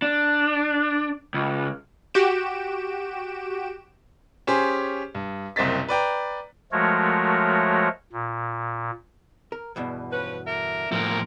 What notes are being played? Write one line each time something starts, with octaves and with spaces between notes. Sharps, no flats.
D4
C#2
F#4 G4 D7 E7
C#4 G4 G#4 C5
G2
F#1 C2 C4 D#5 A6 B6
B4 D5 G5 A#5
F3 G#3 A3 F#4 A#4 C#5
A#2
A#4
E2 G2 B2
F3 C#4 B4
D3 A#4 E5
A2 F3 A#4